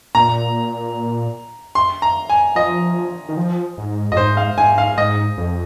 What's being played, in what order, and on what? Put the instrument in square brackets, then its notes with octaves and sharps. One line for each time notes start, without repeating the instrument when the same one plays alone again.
[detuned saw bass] A#2 [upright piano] A#5
[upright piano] C6
A#5
G#5
[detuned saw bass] F3 [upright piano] D#5
[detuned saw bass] D#3
F3
G#2
[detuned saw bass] F2 [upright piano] D#5
[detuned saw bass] G#2 [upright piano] C5
[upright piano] F5
[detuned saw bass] G#2 [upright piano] G#5
[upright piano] F5
[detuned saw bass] G#2 [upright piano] D#5
[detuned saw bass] F2